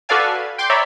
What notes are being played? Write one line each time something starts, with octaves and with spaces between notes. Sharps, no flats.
F#4 A4 B4 D5 F5 G#5
G5 C6 D6 G6
C#5 D5 E5 A#5 B5